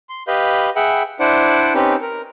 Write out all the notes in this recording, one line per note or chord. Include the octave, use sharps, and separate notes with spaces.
C6
G4 B4 D#5 F5 B5 G6
G#4 E5 F#5 G5 B5
D4 E4 C5 D5 F#5
C4 C#4 D#4 G4 B4
A#4